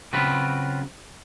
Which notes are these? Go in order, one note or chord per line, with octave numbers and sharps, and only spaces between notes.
C#3 F#3 C4 F4 B4